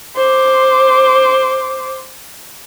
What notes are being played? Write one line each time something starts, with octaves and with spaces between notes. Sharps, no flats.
C5 D6